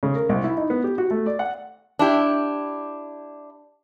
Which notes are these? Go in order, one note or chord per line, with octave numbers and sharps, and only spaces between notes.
C#3
A#4
C2
E4
D#4
B3
G4
F#4
A3
D5
F#5
D4 E4 G4